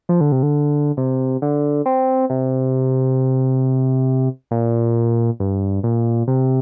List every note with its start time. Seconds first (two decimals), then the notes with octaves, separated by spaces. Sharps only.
0.09 F3
0.21 D3
0.32 C3
0.43 D3
0.97 C3
1.42 D3
1.86 C4
2.30 C3
4.51 A#2
5.40 G2
5.83 A#2
6.27 C3